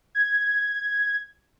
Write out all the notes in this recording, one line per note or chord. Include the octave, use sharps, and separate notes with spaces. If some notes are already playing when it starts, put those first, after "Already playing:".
G#6